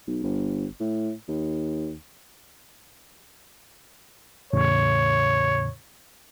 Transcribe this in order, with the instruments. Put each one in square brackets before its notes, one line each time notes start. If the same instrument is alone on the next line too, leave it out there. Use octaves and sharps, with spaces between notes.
[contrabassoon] B1
G1
A2
D#2
[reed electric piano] E2 A2 C#3 [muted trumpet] C#5